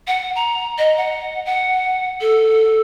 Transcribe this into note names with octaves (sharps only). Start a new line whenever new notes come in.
F#5
A#5
D#5
F#5
F#5
A4